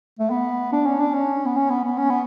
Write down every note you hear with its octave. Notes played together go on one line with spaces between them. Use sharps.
A3
B3
D4
C#4
D4
C#4
B3
C#4
B3
B3
C#4
B3